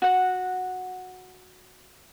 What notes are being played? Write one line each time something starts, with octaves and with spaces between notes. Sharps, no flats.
F#4 F#5